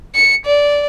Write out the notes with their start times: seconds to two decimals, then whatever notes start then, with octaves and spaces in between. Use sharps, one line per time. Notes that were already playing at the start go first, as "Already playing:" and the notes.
0.15 C#7
0.46 D5